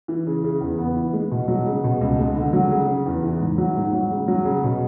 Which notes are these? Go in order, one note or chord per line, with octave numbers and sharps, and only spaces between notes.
E3
C#3
C#3
E2
B3
E3
G#3
B2
F#3
C#3
B2
C#2
G#3
D3
F#3
C#3
C#3
E2
E3
G#2
F#3
G#2
F#3
C#3
F#3
C#3
B2